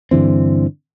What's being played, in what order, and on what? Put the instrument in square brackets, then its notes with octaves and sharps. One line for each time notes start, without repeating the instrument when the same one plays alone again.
[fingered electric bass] G2 D3 E3 C4